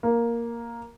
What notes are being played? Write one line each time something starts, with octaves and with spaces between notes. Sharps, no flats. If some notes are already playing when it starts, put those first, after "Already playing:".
A#3